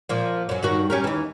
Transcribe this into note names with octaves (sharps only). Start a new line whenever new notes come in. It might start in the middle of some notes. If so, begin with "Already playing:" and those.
A#2 F3
F#2 F#3
G2 D#3 F#4
C#4 G4 A#4
D#2 E3